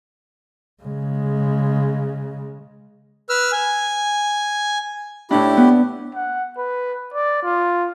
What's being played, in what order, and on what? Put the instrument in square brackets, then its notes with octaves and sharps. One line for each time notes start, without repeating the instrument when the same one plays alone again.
[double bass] C#3 G#3
[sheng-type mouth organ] B4 E6 F6
G#5
[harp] A2 D4 [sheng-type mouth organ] E4 G4
[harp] B3
[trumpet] F#5
B4
D5
F4